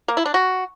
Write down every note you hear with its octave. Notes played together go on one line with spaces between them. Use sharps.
A#3
E4
D4
F#4